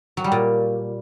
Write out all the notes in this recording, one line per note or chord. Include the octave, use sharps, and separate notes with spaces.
F#3
G3
A#2